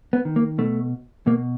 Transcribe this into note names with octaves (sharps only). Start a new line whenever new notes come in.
B3
D#3
A#3
B2 A3
B2 A#3